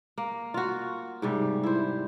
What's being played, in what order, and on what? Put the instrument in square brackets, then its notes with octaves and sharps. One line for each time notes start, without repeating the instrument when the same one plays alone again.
[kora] A#3
F4 F#4
G#2 C3 G3
E4 C5